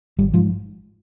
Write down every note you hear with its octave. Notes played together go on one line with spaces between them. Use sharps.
G#1 G3
G#2 F3